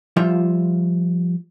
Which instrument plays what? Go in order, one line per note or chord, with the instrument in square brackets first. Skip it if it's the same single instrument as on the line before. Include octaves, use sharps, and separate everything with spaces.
[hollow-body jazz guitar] F3 G3 F4 E5